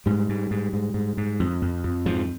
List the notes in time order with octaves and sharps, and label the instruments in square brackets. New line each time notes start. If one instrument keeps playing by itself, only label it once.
[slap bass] G#2 G3
G#2
G#2
G#2
G#2
G#2
F2
F2
F2
G#2 F3